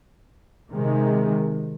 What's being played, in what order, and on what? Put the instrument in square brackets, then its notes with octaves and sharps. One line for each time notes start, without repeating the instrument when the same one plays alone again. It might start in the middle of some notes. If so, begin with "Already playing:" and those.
[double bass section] C3 D#3 G#3